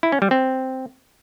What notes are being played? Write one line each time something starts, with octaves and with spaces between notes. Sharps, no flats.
E4
C#4
G3
C4